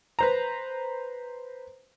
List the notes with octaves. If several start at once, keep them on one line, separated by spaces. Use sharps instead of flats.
B4 C5 A#5